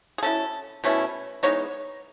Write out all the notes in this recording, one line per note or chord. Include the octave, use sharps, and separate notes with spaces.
G#4
F#3 C#4 E4 A4
B2 A3 C#4 E4
E3 G#3 B3 D#4 C#5